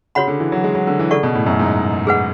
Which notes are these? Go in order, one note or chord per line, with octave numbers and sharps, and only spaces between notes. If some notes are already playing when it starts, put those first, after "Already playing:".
C#3 F#4 C#5 F#5 B5
D3
E3
F#3
G#3
F#3
D3
E3
C#3 A4 D5 F#5 C#6
B2
A2
F#2
G#2
G#4 B4 F#5